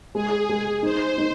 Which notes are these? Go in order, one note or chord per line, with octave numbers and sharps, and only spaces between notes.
G#3 G#4
G#3
D#4 C5
D#4